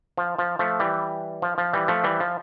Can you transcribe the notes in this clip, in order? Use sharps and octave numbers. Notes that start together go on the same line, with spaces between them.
F3
F3
F3 A3
E3 G3
F3
F3
E3 G3
F3 A3
E3 G3
F3